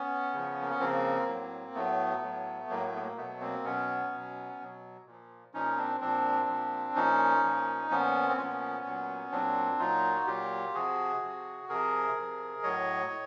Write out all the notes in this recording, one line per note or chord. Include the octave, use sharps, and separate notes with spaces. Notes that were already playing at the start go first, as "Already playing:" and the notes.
Already playing: B3 C#4
C#3 F3
A#3
B3
C#3 F3 A#3 C4
A2 F#3
A2 F#3 A3 B3
A2 F#3
A2 F#3 A#3
A3
B3
A#3
B2 F#3 A3 B3
A#3 C4
B2 F#3 B3 C#4
B2 F#3
B2 F#3
A#2 F3
A#2 F3 C#4 D#4
C4 D4
A#2 F3 C4 D4
A#2 F3
A#2 F3 C#4 D#4
A#2 F3
A#2 F3 B3 C#4
C4
A#2 F3 B3 C#4
A#2 F#3
A#2 F#3 C4 D4
A#2 F#3 D#4 F4
F#4
A#2 F#3 F4 G4
C3 F3 F#4 G#4
C3 F3
C3 F3 G#4 A#4
C3 F3
A2 F#3 C#5 D#5
A2